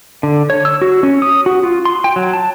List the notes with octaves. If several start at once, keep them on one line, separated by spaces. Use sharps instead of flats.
D3
C#5
E6
F#4
C#4
D#6
F#4
F4
C6
G5
F#3
A5